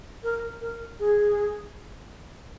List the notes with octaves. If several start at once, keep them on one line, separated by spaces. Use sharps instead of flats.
A#4
A#4
G#4